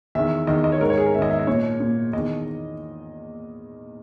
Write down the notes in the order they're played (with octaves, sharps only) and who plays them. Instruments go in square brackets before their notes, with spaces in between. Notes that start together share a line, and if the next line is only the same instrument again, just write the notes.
[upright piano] E2 D#3 E5
E2 D#3 D#5
D#5
C#5
G#2 D#3 A#4
C#5
G#4
A#4
G#2 E5
D#3 D#5
E5
D#5
A#2 C#5
A#2
E2 D#3 D#5